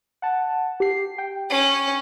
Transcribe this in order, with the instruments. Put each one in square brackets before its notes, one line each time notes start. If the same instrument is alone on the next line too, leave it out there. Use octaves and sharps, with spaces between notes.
[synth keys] F#5 A5
G4 C7
G5
[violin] C#4